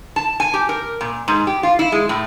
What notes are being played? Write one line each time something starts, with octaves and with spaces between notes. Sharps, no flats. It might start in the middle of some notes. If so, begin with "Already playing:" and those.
A5
G#5
G4
A#4
A#2
G#2
G4
F4
E4
G#3
A2